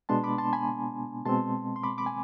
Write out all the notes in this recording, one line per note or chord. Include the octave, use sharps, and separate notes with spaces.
B2 G#3 B3 D4 A5 C6
B5 D6
A5 C6
G#5 B5
B2 G#3 C4 A5 C6
C6
B5 D6
B5 D6
G#5